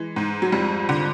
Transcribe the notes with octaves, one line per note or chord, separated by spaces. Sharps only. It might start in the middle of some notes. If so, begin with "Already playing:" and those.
Already playing: E3 G#3
G#2
F#3
F2 G3
D3